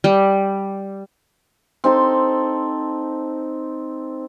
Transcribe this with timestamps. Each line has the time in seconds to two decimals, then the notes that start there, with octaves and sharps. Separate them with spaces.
0.04 G3
1.84 C4 D#4 A4 C6